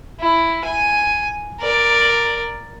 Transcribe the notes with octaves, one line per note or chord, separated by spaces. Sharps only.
E4
G#5
A#4 D5